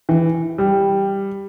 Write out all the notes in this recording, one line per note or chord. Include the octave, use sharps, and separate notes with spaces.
E3
G3